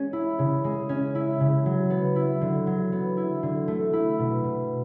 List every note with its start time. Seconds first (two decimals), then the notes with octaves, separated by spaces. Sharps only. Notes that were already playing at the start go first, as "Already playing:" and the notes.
Already playing: G#3 C#4
0.13 E4
0.39 C#3
0.64 G#3
0.89 C#4
1.15 E4
1.40 C#3
1.66 F#3
1.90 B3
2.16 E4
2.41 D3
2.67 F#3
2.92 B3
3.17 E4
3.43 D3
3.68 A3
3.93 E4
4.19 B2
4.44 B2